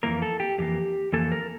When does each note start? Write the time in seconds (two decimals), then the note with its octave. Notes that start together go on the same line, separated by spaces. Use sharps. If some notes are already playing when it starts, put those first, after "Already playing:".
0.03 F2 E3 A#3 A#4
0.22 A4
0.40 G4
0.58 F2 E3 A#3 G4
1.13 F2 E3 A#3 A4
1.32 A#4